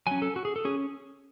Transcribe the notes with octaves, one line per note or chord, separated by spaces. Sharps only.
F#3 C#4 G#5
A4
F#4
G#4
A4
C#4 G#4